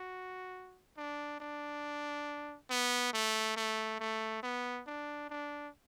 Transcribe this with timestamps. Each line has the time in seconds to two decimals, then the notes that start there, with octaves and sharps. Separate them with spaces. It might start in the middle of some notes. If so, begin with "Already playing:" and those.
Already playing: F#4
0.97 D4
1.40 D4
2.70 B3
3.13 A3
3.57 A3
4.00 A3
4.43 B3
4.87 D4
5.30 D4